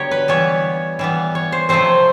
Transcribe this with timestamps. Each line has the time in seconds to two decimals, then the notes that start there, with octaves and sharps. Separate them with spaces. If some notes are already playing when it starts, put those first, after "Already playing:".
Already playing: D3 F#3 B3 G4 C#5
0.11 B4
0.28 E3 G3 B3 C#5
0.99 E3 G3 B3
1.35 C#5
1.52 C5
1.69 C3 F3 A3 C4 C5